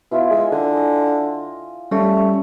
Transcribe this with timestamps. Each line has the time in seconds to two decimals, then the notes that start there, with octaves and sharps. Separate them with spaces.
0.11 B2 E4 F4 E5
0.30 G#3
0.52 D3 G#5
0.77 D#5
1.91 G3 A3 C#4 C#5